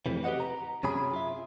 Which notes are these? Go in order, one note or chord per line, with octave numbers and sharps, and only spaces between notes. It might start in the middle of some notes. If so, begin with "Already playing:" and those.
F2 A2 C3 E3
G4 B4 C#5 D#5 F#5
A#5
F#2 C3 C#4 G#4 B5
F4 E5